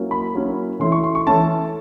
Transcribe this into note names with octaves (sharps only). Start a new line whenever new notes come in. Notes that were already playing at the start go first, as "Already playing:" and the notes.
Already playing: F#3 A#3 C#4 E4
B5
F#3 A#3 C#4 E4
E3 A3 C#4 E4 C6
C#6
C6
C#6
E3 A3 C#4 E4 A5